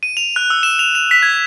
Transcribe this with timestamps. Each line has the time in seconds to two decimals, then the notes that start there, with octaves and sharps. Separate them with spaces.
0.03 D#7
0.17 F7
0.36 F#6
0.50 E6
0.63 E7
0.79 F7
0.95 F7
1.11 B6
1.23 G#6